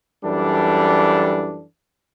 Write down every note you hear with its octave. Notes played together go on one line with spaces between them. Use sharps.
F#2 E3 G3 D4 A4